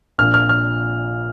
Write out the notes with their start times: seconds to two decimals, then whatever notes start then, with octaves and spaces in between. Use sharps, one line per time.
0.18 A#1 A#2 F3 F6
0.34 F6
0.49 F6